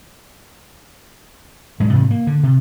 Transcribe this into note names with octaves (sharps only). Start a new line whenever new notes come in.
G#2 F#3 G#3
G#2 C3 E3
A#3
D3
C3